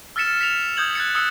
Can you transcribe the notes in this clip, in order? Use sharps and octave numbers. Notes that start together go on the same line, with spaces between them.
E6 F6 A6 B6 C#7 E7
B6 C#7 F7
D#6 G6 G#6 F#7
F#6 G#6 A6 C#7
D#6 E6 C#7